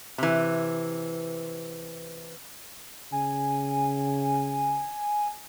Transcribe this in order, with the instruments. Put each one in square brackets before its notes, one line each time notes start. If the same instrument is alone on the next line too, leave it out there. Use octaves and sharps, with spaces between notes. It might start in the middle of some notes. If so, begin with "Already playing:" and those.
[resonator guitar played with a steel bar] C3 E3
[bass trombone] C#3 [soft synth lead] G#5